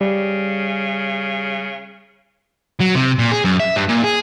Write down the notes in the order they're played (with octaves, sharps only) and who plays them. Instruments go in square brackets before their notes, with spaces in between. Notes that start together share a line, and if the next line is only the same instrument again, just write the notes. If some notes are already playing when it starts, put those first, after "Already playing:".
[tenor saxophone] C#3 [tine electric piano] G3
[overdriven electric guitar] F#3
C3
A#2
G#4
F#2
E5
G2
A#2
G#4